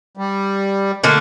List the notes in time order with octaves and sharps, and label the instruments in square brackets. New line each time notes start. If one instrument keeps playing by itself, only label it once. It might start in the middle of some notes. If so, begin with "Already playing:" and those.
[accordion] G3
[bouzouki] D3 A3 A#3